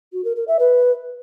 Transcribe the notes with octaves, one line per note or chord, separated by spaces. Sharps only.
F#4
A#4
A#4
E5
B4